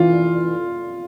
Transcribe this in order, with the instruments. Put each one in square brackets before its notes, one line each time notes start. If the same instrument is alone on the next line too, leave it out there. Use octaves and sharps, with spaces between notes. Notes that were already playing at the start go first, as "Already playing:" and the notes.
Already playing: [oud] E3 [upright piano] F4